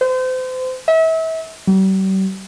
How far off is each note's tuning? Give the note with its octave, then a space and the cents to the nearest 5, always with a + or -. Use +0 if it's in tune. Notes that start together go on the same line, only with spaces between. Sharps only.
C5 -35
E5 -35
G3 -45